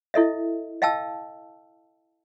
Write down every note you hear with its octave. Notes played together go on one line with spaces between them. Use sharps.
E4 A4 D#5 E5
D#5 F5 G5 A5 E6